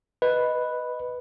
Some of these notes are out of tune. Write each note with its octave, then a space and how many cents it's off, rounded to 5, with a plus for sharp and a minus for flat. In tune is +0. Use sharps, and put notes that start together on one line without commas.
B4 +0 D#5 +0